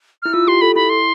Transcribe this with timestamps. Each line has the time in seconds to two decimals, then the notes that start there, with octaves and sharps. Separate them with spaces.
0.22 E4 F6
0.33 F4 E6
0.48 G4 C6
0.61 A4 B5
0.76 E4 B5
0.89 C6